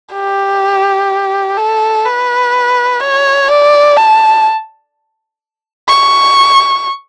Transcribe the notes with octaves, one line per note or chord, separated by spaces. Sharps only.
G4
A4
B4
C#5
D5
A5
C#6